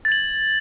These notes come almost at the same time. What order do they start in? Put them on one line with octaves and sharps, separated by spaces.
A6 G#6 F#7